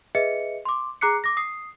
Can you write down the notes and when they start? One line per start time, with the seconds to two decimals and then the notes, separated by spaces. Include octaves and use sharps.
0.15 G#4 B4 D#5 E5 C#7
0.65 C6 D6
1.01 G#4 A#5 D6 F#6 C7 C#7
1.24 D6 A#6
1.37 D#6 C7